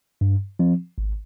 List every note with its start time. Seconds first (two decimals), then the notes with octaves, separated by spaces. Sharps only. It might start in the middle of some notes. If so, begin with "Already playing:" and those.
0.21 G2
0.59 F3 C4
0.98 G#1